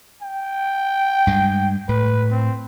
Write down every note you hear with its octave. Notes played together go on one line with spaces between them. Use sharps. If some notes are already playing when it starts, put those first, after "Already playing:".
G5
G2 G#3
A2 B4
C4